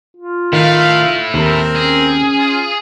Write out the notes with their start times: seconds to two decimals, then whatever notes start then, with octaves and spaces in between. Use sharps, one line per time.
0.17 F4
0.53 D#3 A3 E4 F5
1.34 D#2 C4 A#4
1.75 C#4 G#4
2.38 F4